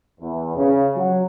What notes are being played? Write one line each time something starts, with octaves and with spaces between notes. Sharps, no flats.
E2
C#3
F#3